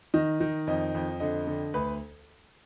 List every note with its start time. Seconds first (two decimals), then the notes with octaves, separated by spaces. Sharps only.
0.14 D#3 D#5
0.41 D#3
0.67 F2 D#5
0.94 F2
1.20 D3 D#5
1.47 D3
1.74 D2 B4